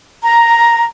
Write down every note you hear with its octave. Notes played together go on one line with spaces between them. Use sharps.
A#5